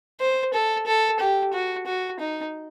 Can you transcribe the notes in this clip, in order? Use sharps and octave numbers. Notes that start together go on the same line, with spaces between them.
C5
A4
A4
G4
F#4
F#4
D#4